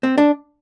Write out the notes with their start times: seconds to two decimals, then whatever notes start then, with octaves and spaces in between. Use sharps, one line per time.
0.03 C4
0.18 D4